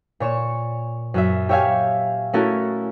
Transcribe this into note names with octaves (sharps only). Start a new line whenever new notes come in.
A#2 C#5 C#6 E7
F#2 F#4 E5
G4 C#5 E5 F5 G#5
A3 C#4 E4 F#4 A4 A#4